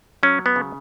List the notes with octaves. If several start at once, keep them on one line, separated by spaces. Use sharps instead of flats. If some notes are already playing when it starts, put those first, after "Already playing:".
F#3 C#4
B3
C#3